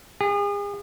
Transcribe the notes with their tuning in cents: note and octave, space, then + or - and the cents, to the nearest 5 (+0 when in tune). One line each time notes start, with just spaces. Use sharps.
G#4 -40